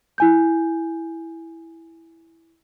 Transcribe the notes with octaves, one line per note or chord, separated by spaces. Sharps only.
E4 G#5 G6